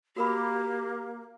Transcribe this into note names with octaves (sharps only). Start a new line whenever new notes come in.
A#3 F#4 G4 A#4 B5